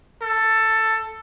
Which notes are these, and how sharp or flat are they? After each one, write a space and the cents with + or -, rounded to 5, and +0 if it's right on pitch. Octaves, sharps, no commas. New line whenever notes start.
A4 +10